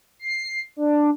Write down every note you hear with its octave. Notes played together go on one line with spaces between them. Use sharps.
C7
D4